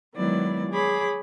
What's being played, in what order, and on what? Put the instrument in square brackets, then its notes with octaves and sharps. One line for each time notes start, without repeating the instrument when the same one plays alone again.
[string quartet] D#3 F#3 G#3 B3 E4 D5
G#4 C#5 B5 D6